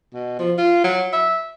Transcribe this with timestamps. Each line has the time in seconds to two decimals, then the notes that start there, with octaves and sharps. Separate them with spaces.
0.14 B2
0.39 F3
0.58 F4
0.84 F#3
1.13 E5